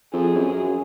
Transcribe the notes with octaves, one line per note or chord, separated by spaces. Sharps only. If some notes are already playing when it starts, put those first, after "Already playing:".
F2 G#4
F#2
F#2